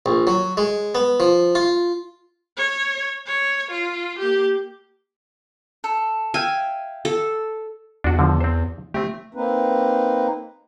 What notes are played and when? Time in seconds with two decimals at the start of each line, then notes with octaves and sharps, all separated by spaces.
0.06 A#1
0.27 F#3
0.57 G#3
0.95 B3
1.20 F3
1.55 F4
2.57 C#5
3.26 C#5
3.71 F4
4.19 A#3 G4
5.84 A4
6.34 E5 F5 G5 G#5
7.05 A4
8.04 E2 D4 F#4
8.19 D3 F3
8.41 C4 C5
8.94 A3 C4 G4
9.34 A#3 C4 D#4 B4